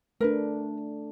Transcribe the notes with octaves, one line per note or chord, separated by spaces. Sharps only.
A3 D4 A#4 B4